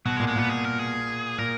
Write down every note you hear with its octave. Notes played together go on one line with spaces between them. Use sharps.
B2 F#3
G#3
A#2
G#3
A#2 B3
G#4
A#4
G#4
A#2 A#4